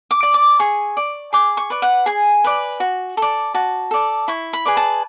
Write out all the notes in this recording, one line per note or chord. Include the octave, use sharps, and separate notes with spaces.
D6
D5
D6
G#4 C#6
D5
G#4 D6
C#6
B4 D5
F#5
G#4 G#5
B4 D5
F#4
A4 D5
F#4 A5
A4 D5
E4 C#6
B5
G#4 B4 D5
A5